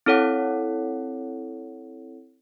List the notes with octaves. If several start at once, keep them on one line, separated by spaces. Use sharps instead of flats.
C4 E4 A4 C#5 F#5